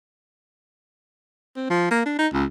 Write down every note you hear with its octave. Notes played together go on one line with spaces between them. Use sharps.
C4
F3
A#3
D4
D#4
C#2